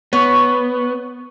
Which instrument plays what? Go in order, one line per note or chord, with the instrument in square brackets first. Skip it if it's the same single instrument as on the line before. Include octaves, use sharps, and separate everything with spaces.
[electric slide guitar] B3 [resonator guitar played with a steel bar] C#5